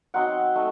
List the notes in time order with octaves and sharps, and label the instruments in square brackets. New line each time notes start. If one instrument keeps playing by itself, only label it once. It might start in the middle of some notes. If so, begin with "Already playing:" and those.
[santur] F#3 C4 D#4 F#5
A3 D#4